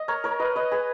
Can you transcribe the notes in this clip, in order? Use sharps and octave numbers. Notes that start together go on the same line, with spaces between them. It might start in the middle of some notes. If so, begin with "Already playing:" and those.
Already playing: D#5
A#4 C#5
A#4 C#5
B4 D#5
B4 D#5
G#4 B4